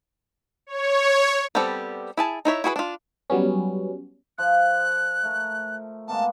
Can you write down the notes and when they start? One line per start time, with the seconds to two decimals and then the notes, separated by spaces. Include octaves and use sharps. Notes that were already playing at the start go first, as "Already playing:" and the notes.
0.67 C#5
1.55 G3 B3 C4 G4 A4
2.17 E4 G#4 A5
2.45 D#4 E4 C#5 E5
2.64 E4 F#4 G#4 A#4 B4
2.76 D4 F4
3.30 F#3 G3 B3 C#4
4.38 F3 F#6
5.23 A3 A#4
6.08 G#3 A#3 B3 A5